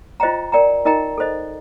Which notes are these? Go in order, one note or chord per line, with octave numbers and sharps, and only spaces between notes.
F4 C5 D#5 G5 A#5
A#4 D5 G5 A#5
D#4 A#4 D#5 G5 A#5
A4 C5 D#5